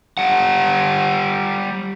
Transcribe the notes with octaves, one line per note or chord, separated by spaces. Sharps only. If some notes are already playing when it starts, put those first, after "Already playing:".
G3 F#5